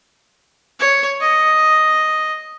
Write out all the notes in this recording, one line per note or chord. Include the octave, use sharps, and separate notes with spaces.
C#5
D#5